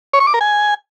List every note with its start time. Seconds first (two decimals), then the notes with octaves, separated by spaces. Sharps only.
0.13 C#5
0.20 C#6
0.27 D6
0.34 A#4
0.41 G#5